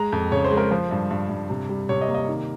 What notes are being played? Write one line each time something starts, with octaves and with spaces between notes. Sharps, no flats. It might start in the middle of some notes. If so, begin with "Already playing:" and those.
Already playing: G#3 A#5
F2
C#3 C#5
C5
G#3
A#4
F3 C5
G2
G2
G2
C3
G3
C3 C#5
D#5
A#3
D#5
D#3